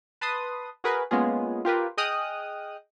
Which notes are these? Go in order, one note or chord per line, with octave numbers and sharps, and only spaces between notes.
B4 A5 C6 D#6
F#4 G#4 A#4 B4
G#3 A#3 B3 C#4 F4 G#4
F4 G4 A#4 B4
G#4 D#5 G5 D#6 F6 F#6